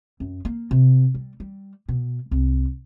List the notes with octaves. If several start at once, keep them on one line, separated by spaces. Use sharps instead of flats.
F#2
A#3
C3
G3
G3
B2
C2